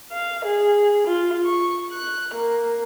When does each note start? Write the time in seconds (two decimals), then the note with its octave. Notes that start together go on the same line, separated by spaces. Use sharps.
0.11 F5
0.46 G#4
1.07 F4
1.45 C#6
1.92 F#6
2.34 A#3